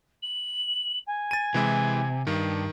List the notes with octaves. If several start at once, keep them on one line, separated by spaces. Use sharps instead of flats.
F#7
G#5
A6 D#7
C3 E3 G#3 E4
G2 D#3